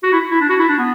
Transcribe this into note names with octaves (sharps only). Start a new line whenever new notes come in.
F#4
E4
E4
D4
F#4
E4
D4
B3